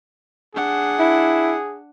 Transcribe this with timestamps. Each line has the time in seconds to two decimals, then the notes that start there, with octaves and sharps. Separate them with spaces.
0.55 D4 G#4 F#5
0.99 E4